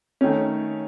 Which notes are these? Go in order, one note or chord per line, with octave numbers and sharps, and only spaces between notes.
D#3 A3 C#4